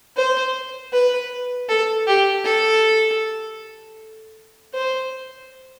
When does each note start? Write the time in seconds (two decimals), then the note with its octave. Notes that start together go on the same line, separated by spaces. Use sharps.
0.16 C5
0.93 B4
1.69 A4
2.07 G4
2.44 A4
4.74 C5